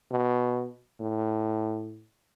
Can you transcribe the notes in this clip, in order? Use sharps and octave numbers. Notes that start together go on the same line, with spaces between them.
B2
A2